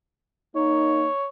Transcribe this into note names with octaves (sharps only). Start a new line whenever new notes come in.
A#3 D#4 C#5